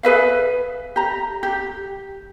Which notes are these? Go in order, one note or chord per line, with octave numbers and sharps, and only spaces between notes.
G#4 B4 E5 F5
G4 A#5
G4